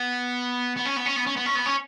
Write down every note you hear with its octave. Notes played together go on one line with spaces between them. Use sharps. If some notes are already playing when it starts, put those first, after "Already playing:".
Already playing: B3
B3
C#4
B3
C#4
B3
C#4
B3
C#4
B3
C#4